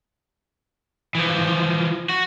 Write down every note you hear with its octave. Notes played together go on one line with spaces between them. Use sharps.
E3 F3
F#4